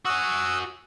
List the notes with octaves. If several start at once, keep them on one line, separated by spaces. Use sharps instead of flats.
F#4 F#5 G#5 D#6 E6